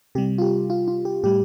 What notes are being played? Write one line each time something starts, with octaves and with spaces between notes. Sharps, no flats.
C3 G3 G4
F4
G4
F4
F4
G4
A2 G3 G4